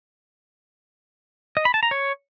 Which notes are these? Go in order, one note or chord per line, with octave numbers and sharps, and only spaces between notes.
D#5
B5
A5
A#5
C#5